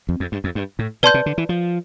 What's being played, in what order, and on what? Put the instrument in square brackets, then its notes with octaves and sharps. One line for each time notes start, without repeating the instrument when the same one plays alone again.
[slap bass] F2
F2
G2
F2
G2
A2
[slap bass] B2 [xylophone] B4 D5 A5 C6 G6
[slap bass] C3
D3
E3
F3